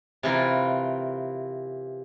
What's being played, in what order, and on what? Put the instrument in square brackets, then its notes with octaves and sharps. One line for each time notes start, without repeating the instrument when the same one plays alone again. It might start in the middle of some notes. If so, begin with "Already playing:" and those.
[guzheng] C3 E3 F4 A#4